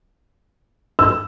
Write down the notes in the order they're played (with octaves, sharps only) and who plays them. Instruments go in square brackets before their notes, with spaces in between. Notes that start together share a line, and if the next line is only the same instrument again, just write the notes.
[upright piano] E6